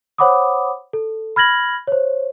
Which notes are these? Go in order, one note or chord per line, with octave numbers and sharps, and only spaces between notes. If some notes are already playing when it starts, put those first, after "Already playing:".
C5 C#5 F#5 B5 D6 D#6
A4
B5 F6 G#6 A#6 F#7
C5 C#5